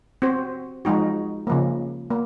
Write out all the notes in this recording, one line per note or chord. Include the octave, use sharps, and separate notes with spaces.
C4 F#4 C5
F3 G#3 D#4 F#4
C#3 F3 A#3
A#3